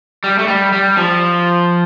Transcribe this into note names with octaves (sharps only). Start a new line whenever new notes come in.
G3
A3
G3
G3
F3